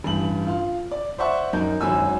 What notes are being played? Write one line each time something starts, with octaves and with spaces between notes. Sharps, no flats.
A1 G2 F#7
F4
D5
C5 D5 E5 F#5 C#6
F#2 D#4 A#4 G6
G#1 F#2 F#3 F#4 G#5 E6